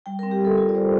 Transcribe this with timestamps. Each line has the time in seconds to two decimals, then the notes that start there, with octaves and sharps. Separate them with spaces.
0.06 G3 G5
0.19 A#4
0.23 C4
0.31 G4
0.41 G3 A4
0.58 F4 A#4
0.69 D5
0.75 G3 C5